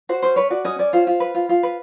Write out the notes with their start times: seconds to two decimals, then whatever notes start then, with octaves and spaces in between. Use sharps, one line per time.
0.09 F#4 C5
0.22 C#4 C5
0.36 B4 C#5
0.50 F#4 D5
0.64 C#4 D#5
0.79 C#4 D5
0.93 F4 C5
1.07 F4
1.20 B4
1.34 F4
1.49 F4
1.63 B4